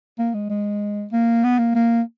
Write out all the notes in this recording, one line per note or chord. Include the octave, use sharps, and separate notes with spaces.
A#3
G#3
G#3
A#3
B3
A#3
A#3